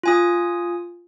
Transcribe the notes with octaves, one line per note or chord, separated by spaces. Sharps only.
F4 G#5 D#6